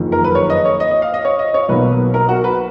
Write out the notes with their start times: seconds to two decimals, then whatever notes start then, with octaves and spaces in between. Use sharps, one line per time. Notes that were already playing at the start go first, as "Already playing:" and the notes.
Already playing: F#1 F2 D#3
0.12 A#4
0.24 B4
0.35 C#5
0.50 D#5
0.65 C#5
0.80 D#5
0.91 D#5
1.02 F5
1.14 D#5
1.25 C#5
1.39 D#5
1.54 C#5
1.69 B1 B2 F#3 A#3 B4
2.14 A#4
2.29 F#4
2.44 B4